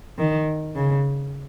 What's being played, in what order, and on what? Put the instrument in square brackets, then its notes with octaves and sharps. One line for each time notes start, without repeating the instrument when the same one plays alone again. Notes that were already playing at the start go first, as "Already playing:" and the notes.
[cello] D#3
C#3